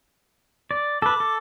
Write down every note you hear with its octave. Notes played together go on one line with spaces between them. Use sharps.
D5
A4 B4 D6
A4